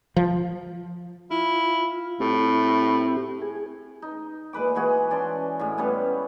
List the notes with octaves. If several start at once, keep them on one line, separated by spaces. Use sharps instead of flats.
F3
E4 F4
A2 C4 E4 G4
G#4
D#4
A#2 G#3 B4 D6
E3 G#3 F#4 G#4
C#4 D5 A5 C6
A2 D3 G#3
G3 B3 C#4